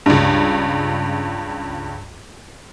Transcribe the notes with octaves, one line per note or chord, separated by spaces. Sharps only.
C#2 G2